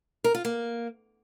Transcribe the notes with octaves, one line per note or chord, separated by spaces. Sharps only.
A#4
F4
A#3